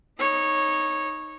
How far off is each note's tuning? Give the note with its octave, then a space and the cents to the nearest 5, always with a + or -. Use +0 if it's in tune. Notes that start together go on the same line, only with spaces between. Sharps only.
D#4 +0 C#5 -10